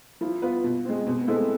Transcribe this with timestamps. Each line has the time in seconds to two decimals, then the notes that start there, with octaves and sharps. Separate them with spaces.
0.21 F3 E4
0.42 B3 F4 B4
0.64 B2
0.85 G#3 C4
1.07 B2 C4
1.21 B3
1.27 G#3 C4 E4 A4
1.35 A3